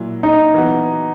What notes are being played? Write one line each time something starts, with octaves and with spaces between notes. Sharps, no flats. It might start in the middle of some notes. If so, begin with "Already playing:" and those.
Already playing: A#2 F#3 E4
D#4
E3 B3 F#4